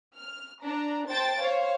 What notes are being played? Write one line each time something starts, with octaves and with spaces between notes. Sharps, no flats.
F6
D4 A#5
C5 G5 A5 A6 D7
C5 C#5 F5